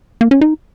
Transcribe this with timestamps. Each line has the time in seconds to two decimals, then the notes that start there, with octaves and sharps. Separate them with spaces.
0.21 A#3
0.31 C#4
0.41 D#4